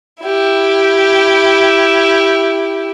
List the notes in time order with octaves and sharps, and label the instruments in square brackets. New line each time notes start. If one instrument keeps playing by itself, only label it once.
[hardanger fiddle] E4 G4